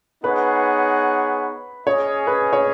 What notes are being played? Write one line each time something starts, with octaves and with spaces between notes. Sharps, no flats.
B3 D#4 G#4 B4 C#5 F#5
C#4 G#4 C#5 D#5
B4
C#5